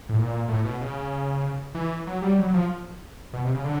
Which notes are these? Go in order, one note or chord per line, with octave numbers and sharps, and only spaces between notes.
A2
A#2
A2
B2
C#3
E3
F#3
G3
F#3
F3
B2
C3
C#3
D3